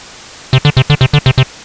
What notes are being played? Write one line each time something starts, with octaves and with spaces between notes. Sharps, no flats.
C3
D3
C3
D3
C3
D3
C3
C3